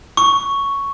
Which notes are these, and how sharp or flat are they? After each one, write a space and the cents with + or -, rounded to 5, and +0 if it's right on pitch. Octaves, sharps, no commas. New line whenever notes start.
C#6 +5